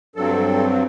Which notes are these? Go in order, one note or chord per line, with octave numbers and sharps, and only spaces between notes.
G2 F#3 C4 A4